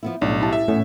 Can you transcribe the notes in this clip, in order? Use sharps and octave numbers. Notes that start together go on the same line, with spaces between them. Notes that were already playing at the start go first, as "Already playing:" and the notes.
F3 B3 E4
B1 A2 G3 C#4 D4
E4 G4 A5
E5
E2 A2 B3 C#4